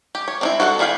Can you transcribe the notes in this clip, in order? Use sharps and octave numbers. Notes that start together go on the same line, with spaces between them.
G4
C#5
C4 D#4 E4
F#4 A4 B4 F#5
D#3 E4 G#4 F5 G5